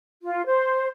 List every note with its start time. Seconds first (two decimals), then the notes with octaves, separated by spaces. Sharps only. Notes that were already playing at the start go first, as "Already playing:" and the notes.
0.22 F4
0.46 C5